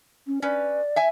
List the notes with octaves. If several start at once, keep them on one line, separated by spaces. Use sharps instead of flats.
C#4
C#4 B4 D5
E5 G#5